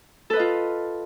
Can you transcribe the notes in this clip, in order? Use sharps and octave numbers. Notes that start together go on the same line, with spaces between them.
F4 A4 B4 D#5